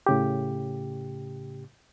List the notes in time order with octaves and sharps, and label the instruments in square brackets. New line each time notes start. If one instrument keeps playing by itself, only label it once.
[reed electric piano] A2 C#3 G4